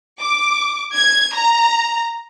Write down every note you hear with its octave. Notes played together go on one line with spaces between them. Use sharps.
D6
G#6
A#5